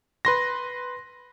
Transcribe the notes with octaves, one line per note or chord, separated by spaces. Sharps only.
B4 C6 A#6